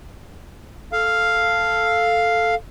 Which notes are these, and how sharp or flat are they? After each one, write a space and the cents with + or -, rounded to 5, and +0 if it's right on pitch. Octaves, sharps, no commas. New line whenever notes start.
A4 +0 F5 +0